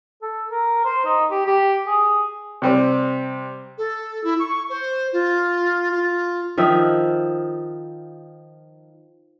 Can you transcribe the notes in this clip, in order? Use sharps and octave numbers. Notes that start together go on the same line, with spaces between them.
A4
A#4
C5
D#4
G4
G4
G#4
C3 G3 C4
A4
E4
C#6
C5
F4
F4
D#3 F3 E5